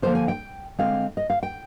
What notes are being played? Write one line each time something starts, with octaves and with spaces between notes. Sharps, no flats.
D3 F3 A#3 C5
G#5
G5
D3 G#3 C4 F5
D#5
F5
G5